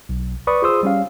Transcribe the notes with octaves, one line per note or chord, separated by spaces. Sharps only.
B1
B4 D5 B5 C#6 D#6
F4 G#4 C5 C6 D#6 E6
G3 C#4 F5